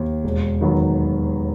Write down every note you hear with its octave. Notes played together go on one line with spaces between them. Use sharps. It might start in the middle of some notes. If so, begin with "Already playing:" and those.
Already playing: D#2
E1
D#3 F#3 B3